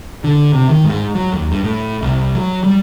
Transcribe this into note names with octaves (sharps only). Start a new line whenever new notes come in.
D3
C3
D#3
G#2
F#3
D#2
G2
A2
C2
F#3
G3